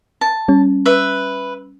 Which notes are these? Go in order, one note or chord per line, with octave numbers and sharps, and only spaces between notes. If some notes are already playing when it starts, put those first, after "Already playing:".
A5
G3 C#4
B4 E5